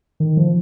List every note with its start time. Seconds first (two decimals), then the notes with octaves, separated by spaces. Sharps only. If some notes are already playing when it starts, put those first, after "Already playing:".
0.20 D#3
0.37 F3